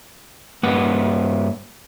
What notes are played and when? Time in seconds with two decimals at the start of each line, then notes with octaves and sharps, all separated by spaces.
0.63 G2 A#3 B4 F#5